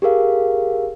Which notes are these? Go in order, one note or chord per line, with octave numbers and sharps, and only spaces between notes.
G4 G#4 A#4 F5